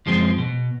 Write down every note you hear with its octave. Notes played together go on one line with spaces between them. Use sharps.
F#2 F3 G#3 C4
B2